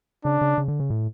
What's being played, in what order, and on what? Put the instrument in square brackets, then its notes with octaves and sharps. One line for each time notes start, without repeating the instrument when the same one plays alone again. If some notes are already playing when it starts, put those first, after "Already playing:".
[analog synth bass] C#3 [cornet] D4
[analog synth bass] C#3
C#3
D3
C#3
A2